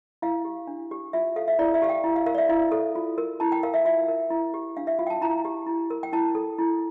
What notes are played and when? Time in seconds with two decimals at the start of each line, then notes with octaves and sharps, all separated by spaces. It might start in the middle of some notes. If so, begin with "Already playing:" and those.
0.22 E4 F5
0.45 G4
0.67 D4
0.91 G4
1.13 F4 E5
1.36 A4 F5
1.48 E5
1.59 E4 D5
1.74 E5
1.82 G4 F5
1.89 G5
2.04 E4
2.16 F5
2.26 A#4 F5
2.35 D5
2.38 E5
2.49 E4 F5
2.72 A4
2.95 F4
3.18 A#4
3.40 E4 A5
3.52 G5
3.63 A#4 F5
3.74 E5
3.85 F4 E5
4.08 A#4
4.30 E4
4.54 G4
4.77 D4 F5
4.87 E5
4.99 F4 F5
5.07 G5
5.10 A5
5.21 E4 A#5
5.45 G4
5.67 E4
5.90 A#4
6.03 G5
6.13 E4 A5
6.35 A4
6.58 E4